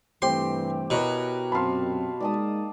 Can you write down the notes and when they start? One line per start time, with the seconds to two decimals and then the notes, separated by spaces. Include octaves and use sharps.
0.22 G2 C3 E3 A3 C4 G4 C6
0.90 B2 E4 A#4 B4 C#5
1.52 F#2 A#2 C4 F5 A5 B5 C6
2.20 G#3 A#3 D#4 D5 A5 D#6